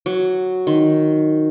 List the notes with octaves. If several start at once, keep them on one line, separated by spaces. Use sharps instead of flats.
F#3
D#3